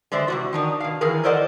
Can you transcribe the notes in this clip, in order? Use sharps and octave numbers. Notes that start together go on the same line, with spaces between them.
D3 G#3 C5 D5 E5
C3 D#3 F#4
D#3 D4 D#4
B2 F5
D#3 E3 G#4 A#4
A4 A#4 C5 D5 D#5 F#5